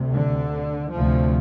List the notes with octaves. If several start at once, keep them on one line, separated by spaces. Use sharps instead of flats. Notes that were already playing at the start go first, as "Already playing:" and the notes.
Already playing: D2 C3
D3
D2 C3 F3